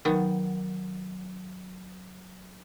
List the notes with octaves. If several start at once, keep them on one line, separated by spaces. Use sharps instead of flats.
D#3 F#3 B3